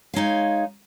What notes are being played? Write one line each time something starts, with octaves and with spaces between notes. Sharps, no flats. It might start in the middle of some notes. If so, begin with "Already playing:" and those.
G#3 D#4 C#5 F5